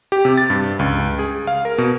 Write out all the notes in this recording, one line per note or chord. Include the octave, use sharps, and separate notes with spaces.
G4
C3
A6
G2
C#2
G#4
F5
A#4
B2